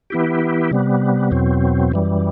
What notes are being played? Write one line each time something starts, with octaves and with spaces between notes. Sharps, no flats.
E3 B3 E4 G4
C3 G3 B3
E2 B2 F#3 C4
F#2 E3 G3